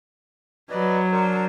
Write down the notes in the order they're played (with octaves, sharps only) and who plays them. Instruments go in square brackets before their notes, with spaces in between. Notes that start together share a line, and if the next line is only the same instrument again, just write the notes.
[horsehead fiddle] F#3 [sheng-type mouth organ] B4 D5 D#5
[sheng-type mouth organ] D4 A#4 C5